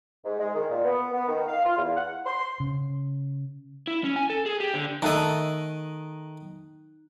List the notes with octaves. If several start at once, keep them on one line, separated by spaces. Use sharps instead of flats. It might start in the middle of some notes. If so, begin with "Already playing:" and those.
G#2
G#3
D#3
A#2
B3
B3
D#3
F5
F4
E2
F#5
C6
C#3
E4
C#4
G#5
A4
G#4
G4
D3
D#3 A3 D#4 A4 D#5 F#6